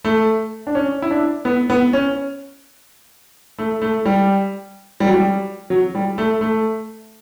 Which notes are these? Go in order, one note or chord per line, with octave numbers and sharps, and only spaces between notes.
A3
D4
C#4
E4
D4
B3
B3
C#4
A3
A3
G3
G3
F#3
G3
F#3
G3
A3
A3